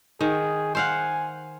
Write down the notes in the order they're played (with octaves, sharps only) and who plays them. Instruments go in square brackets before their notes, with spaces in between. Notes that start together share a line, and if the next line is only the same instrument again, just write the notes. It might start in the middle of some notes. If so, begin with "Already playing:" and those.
[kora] D#3 [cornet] G#4
[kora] C5 F5 F#5 [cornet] G#5